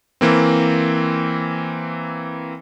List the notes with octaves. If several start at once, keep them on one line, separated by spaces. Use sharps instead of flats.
E3 A#3 C4